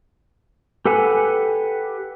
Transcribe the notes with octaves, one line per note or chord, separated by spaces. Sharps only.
G4 A4 B4 F#5 G#5